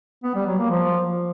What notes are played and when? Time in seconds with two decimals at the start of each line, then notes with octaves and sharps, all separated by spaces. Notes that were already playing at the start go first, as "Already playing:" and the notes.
0.24 B3
0.35 G3
0.47 F#3
0.58 A#3
0.70 F3